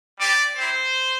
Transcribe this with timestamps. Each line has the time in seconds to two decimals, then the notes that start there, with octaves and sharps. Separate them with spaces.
0.19 G3 C4 G4 D5
0.56 C4 E4 G4 C5